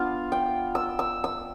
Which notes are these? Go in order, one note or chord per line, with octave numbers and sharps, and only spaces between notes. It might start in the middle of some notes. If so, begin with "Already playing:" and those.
Already playing: B3 D4 F4 F5
G5
E6
E6
E6